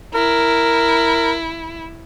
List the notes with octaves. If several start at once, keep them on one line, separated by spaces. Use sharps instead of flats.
E4 A#4